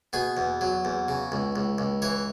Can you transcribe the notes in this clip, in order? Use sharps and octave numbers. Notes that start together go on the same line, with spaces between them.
B2 G#4
E2
F#3
E2
C#3
C#2
C#2
C#2
E3 C#5